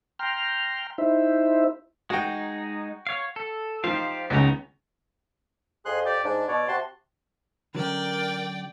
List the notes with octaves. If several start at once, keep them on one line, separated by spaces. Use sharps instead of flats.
G5 A#5 C6 F6
D#4 E4 C5 E5
G#3 D#4 F#4 G5
C#5 F5
A4
F3 D#4 G4 C5 F5
C#2 C#3 B3 D#4 A#5
F2 G#4 C6 F#6
G4 D5
G#2 D4
B2 C#5 D5
C3 F#4 A5 C6
D3 F#3 C#4 A#4 D5 G5